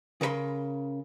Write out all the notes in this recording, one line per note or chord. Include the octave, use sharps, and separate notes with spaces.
C#3 A#4 B4 B5 C6